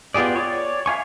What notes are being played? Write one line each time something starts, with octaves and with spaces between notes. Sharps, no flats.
B3 F4 G4 G#4 D5
C#5 D5
E5 F5 G#5 C#6